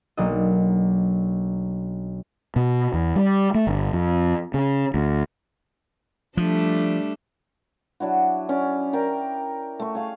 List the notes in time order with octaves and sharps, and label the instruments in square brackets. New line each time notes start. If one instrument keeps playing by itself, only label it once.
[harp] B1 F#3 A#3 D4 D#5
[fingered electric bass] B2
E2
G3
A3
G1
F2
C#3
D2
[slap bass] F3 [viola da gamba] G3 A3 D4
[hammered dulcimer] F#3 D4 E4 F#4
C#4 D5
A#4 D5 G5
A3 C#6
G#4 F5